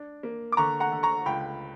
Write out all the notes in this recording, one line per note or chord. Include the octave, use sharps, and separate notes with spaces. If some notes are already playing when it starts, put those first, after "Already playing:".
Already playing: D4
A#3
D6
D3 A#5 C#6
F#5 A#5
D3
A#5 C#6
C#2 G5 B5